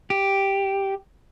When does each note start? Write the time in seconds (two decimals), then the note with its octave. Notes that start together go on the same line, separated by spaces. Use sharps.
0.10 G4